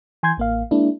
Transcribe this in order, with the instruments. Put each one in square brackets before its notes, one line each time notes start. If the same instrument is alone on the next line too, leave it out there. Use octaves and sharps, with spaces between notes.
[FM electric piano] E3 G#5 C6 G6 G#6
A1 A#3 F5
G#3 A#3 D4 E4